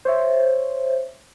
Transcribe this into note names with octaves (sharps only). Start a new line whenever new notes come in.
C5 C#5 E5